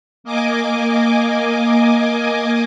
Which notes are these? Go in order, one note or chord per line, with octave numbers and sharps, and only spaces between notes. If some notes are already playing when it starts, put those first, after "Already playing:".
A#3 D#5 G#5 D6